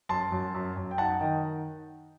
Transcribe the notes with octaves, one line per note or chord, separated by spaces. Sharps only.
F#2 A5 C6
F#2
F#2
F#2
G5
D#4 F#5 A5
D#3 D#5 G5